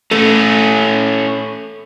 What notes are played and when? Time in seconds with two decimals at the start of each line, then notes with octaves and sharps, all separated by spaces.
0.11 A3 C#4 A4